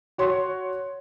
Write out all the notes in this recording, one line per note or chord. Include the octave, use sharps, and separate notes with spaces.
F#4 C#5 C6